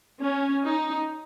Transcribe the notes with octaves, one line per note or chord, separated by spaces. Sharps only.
C#4
D#4